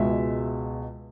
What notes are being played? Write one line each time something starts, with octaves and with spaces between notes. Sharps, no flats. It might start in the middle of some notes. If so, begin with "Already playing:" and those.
Already playing: C#2 B2 G#3 E5